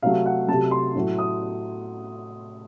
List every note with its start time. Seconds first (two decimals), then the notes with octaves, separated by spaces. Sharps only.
0.02 C3 F#3 A3 F5
0.26 F#5
0.48 A3 A5
0.51 C3 F#3
0.71 C6
0.95 A2 F#3 A3
1.19 D#6